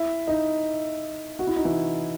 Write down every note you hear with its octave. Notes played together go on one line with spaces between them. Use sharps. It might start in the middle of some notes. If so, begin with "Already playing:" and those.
Already playing: E4 E5
D#4 D#5
F#4
E4
D#4
E3 E4